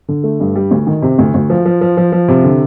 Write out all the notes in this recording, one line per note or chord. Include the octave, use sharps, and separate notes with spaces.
D3
A3
G2
G3
D2
D#3
C3
D2
D2
F3
F3
F3
F3
F3
C3
D3